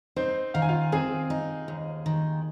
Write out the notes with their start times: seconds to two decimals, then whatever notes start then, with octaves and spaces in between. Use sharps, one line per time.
0.16 C4 D#4 C5
0.54 D#3 F5
0.62 G#5
0.69 F4 F5
0.92 C4 G#4 G#5
1.30 D#4
1.68 D#2
2.06 D#3